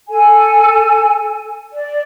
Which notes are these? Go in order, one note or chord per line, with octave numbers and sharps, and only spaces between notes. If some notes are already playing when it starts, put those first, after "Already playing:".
A4 G#5
D5